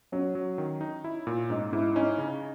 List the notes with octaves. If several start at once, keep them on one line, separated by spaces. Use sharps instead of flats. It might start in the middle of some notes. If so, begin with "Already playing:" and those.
F#3 C#4
F#3
D#3
D#4
E4
A#2
G#2 D#4
G#2 E4
C#4 D#4
C#3